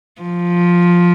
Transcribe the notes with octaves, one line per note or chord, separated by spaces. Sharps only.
F3